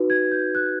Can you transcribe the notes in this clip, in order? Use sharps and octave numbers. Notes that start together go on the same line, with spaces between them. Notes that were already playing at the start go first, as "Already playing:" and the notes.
Already playing: D#4 F#4 B4
G#6
G6
F#6